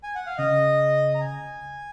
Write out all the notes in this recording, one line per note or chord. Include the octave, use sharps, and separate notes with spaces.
G#5
F#5
F5
C#3 D#5
A#5
G#5